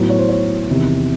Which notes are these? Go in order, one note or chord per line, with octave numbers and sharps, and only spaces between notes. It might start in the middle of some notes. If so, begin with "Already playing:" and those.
Already playing: A2 F#3 B3
C#5
C5
C#5
E2 C3 D#3